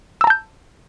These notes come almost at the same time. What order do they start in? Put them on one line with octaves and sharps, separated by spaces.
E6 A#5 A5 G6